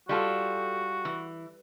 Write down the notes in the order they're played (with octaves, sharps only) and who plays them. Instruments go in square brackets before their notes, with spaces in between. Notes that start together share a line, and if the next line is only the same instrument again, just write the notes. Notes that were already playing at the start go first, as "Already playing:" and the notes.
[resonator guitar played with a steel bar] G3 F4 A4 [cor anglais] F#4
[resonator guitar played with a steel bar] E3